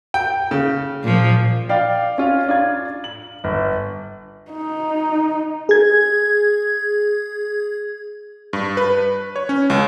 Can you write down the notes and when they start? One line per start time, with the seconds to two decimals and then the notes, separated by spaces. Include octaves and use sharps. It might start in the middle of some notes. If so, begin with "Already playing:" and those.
0.14 G5
0.51 C#3
1.03 A#2 F3
1.69 D5 F5 G5
2.18 C#4 F4
2.48 D4 F4 G#6
3.04 F#7
3.44 G1
4.52 D#4
5.69 G#4 G#6
8.53 G2
8.77 B4
9.36 C#5
9.49 C#4
9.70 C#2